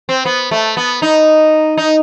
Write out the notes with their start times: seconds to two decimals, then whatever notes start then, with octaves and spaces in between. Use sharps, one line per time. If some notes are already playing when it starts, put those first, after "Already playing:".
0.09 C4
0.25 B3
0.51 A3
0.77 B3
1.02 D#4
1.77 D#4